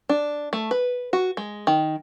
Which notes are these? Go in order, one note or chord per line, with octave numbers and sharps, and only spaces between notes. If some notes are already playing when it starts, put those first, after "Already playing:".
D4
A3
B4
F#4
G#3
D#3